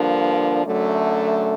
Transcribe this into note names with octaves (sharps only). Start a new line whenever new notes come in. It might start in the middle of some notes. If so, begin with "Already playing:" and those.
Already playing: G2 D3 F3 A#3 D4
F#2 D3 F#3 A3